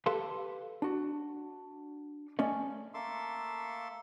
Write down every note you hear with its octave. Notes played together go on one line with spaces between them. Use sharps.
G4 A4 B4 F5 A5 C6
D4 F#4
A3 C#4 D5 D#5
A3 A#3 A4 E5 C6 D6